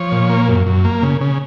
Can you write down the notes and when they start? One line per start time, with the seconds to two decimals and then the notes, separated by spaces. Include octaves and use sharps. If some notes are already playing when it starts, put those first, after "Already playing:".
Already playing: F3 C#5
0.12 A#2
0.30 A#3
0.49 F#2
0.67 F#2
0.85 A#3
1.03 C#3
1.21 C#3